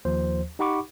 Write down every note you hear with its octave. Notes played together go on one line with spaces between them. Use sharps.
D#2 F3 C5
D#4 G4 F#5 B5 C#6 D6